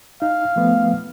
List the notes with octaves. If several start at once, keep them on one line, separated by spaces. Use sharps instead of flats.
D#4 F5
F3 A3 B3